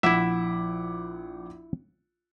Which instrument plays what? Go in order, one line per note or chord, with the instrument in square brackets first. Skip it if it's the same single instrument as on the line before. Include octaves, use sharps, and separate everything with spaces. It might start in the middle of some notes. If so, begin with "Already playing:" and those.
[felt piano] A#1 F#5 D6 [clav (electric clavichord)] E4 E5